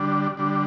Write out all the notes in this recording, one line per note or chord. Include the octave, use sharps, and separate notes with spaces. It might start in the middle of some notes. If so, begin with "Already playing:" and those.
Already playing: D3 G3 D4
D3 G3 D4